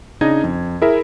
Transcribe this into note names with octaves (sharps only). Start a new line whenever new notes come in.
C#3 D4 D#4 D#5 G#6
F2
E4 G#4 A#4 E5